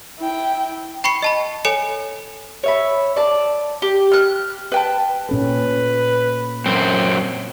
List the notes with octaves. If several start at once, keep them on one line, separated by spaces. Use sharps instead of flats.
E4 G5
G5 B5 C#6 C7 C#7
D#5 A5 B5
A4 C#5 G#5 C#7 E7
C#5 E5 B5
D5 A5
G4
F6 F#6
B4 G5 A5
A#2 C#4 A4 B4
F#2 C4